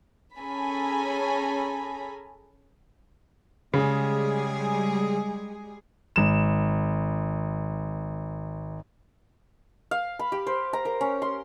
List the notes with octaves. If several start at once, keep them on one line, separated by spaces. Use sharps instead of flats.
C#4 G#4 A4 G#5 A#5 B5
C#3 G3 G#3 G#4
G#1 E7
F5
B5
G4
C5
A#5
A#4
C#4
C6